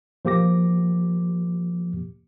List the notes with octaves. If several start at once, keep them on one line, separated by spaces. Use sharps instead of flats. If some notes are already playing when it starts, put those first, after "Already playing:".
F3 A#3 G4 D6 A#6